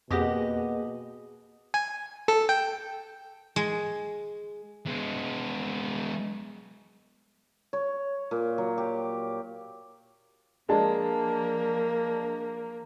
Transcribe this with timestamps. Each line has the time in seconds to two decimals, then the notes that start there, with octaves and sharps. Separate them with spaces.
0.11 F2 B2 A#3 G4 G#4 D#5 F#5 A#6
1.74 G#5
2.28 A4
2.49 G5
3.56 G#3
4.86 G#3 B3
7.73 C#5
8.31 A#2
8.58 F#3
8.78 G4
10.69 F3 G#3 A#3 D4 A5